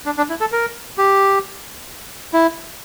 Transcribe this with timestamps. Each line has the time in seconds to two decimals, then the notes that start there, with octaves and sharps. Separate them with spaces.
0.06 D4
0.17 D4
0.30 E4
0.41 A4
0.52 A#4
0.98 G4
2.33 E4